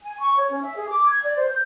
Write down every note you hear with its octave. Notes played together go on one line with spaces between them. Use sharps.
G#5
C#6
C#5
C#4
E5
G#4
D6
G#6
D5
C5
G6